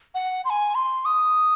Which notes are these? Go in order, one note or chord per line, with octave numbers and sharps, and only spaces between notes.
F#5
C6
G#5
C6
D#6